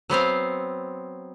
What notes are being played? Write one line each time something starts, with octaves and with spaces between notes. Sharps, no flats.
F#3 B3 C4 F5